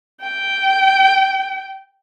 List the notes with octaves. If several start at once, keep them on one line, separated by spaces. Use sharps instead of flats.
G5